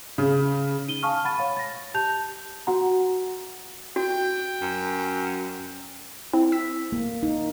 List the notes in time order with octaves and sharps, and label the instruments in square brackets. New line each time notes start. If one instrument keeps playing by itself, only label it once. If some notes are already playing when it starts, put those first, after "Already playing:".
[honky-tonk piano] C#3
[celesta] D#4 D#7 G7
F5 G#5 A5 C#6 D#6 F6
F#5 B5 A6 D#7
C#5 F5 B5
A6 A#6
G4 A5 G6 F7
F#4 F#5 A#5
[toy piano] F#4 [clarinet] G5
[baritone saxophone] F#2
[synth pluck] C4 E4
E6 B6
[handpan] A#3
D#4